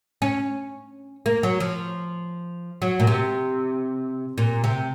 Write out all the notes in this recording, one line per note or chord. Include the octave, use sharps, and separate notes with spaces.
C#4
A#3
F#3
F3
F#3
A#2
C3
A#2
C3